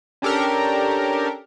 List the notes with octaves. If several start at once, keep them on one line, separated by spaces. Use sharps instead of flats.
C#4 D4 G4 A4 A#4